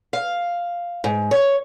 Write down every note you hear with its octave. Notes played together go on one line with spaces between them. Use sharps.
F5
G#2
C#5